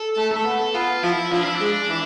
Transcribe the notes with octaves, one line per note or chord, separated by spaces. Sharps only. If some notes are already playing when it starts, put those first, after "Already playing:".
Already playing: A4
A3
A3 A4
B3
B3 F4
F3 E4
F3 D4
E4
D4
G#3
E3